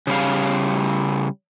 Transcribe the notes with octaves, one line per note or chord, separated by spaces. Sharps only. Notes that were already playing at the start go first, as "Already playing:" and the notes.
C#3 G3 F5